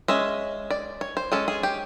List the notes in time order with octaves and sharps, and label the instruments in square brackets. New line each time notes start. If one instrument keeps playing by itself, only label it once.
[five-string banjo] G#3 C#4 E5
D5
C#5
C5
G#3 C#4 A4
G#4
G4